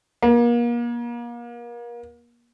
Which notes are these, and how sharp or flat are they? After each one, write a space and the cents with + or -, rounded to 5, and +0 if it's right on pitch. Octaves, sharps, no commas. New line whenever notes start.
A#3 +35